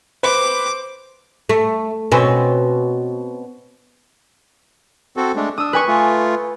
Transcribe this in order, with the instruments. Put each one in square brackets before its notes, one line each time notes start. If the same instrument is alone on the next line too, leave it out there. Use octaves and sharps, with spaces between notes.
[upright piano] B4 [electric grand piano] C5 [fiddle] D6
[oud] A3
B2 C4 C#4
[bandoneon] C4 F#4 A4
G#3 A3 D4
[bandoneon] D4 [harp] D#6 E6
[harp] B4 G#5 C#6
[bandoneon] A3 F4